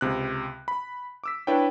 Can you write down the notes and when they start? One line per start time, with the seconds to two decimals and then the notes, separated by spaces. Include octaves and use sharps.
0.01 C#2 C3 F#6
0.68 B5
1.24 D6 E6 B6
1.47 D4 E4 B4 C#5 G5